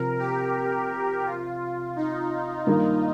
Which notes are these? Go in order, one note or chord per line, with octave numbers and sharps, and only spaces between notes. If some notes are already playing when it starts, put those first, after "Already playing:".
Already playing: C3 F3 C4 A#4
G4
F4
D#4
G2 D#3 A#3